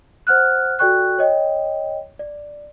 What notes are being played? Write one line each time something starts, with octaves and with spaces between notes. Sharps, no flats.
C5 F#5 F6 F#6
F#4 A4 D5 G5 C#6 F#6
C#5 D#5 G5
D5